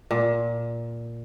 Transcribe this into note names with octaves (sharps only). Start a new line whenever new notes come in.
A#2